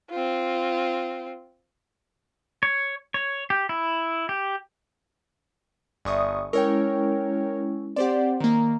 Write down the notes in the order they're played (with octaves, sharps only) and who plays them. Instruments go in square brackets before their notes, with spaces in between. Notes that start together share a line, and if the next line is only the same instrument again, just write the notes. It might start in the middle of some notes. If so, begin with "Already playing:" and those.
[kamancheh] C4 F4
[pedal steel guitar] C#5
C#5
G4
E4
G4
[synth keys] G1 C#6 D#6 [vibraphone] D5 E5
[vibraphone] G#3 C#4 E4 [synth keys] A#4 C#5 G5
[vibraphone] C4 F#5 [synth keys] G4 C5 D5
[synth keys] D#3 A#3 [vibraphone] A#5